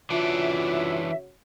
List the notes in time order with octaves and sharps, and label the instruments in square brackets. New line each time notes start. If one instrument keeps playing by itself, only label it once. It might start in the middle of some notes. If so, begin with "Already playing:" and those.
[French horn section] C#3 F#4 C#5 [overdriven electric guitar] E3 D4 [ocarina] F4 [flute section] E5